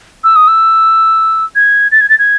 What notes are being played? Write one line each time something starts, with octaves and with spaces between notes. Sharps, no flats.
E6
D#6
E6
G#6
A6
G#6
A6
G#6